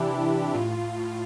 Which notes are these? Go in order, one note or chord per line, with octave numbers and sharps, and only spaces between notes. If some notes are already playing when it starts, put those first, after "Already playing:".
Already playing: C3 E3 D4 E4 G4
E3
E3
A2 F4
A2
A2